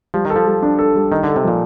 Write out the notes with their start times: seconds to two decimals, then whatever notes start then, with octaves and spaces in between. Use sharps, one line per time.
0.14 F3 G3
0.25 D#3
0.30 A4
0.36 F3
0.46 G3
0.63 D4
0.79 A4
0.95 G3
1.11 D#3 D#4
1.24 D3 A4
1.36 C3
1.44 A#2 F3